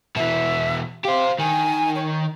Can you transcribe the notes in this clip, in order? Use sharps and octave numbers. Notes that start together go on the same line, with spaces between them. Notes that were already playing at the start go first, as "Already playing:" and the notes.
B2 E3 E5
G4 C5 F5
D#3 G#5
C#5